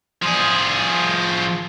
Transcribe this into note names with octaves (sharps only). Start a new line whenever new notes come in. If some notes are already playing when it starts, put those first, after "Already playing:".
F3 G#4